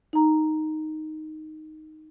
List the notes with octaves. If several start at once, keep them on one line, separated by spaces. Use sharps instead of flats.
D#4 A#5